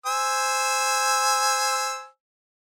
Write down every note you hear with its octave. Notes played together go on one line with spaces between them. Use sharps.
C5 G#5 E6